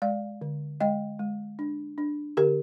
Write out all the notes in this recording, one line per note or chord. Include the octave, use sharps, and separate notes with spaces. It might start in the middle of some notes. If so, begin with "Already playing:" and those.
G#3 D5 F5
D3
G#3 D#5 G5
G#3
D4
D4
D3 G4 A#4